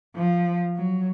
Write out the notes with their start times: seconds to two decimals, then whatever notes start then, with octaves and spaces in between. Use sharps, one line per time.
0.16 F3
0.76 F#3